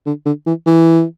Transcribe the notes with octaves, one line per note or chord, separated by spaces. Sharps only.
D3
D3
E3
E3